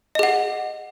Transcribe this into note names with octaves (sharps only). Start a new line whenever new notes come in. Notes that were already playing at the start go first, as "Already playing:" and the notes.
G#4 D#5 F#5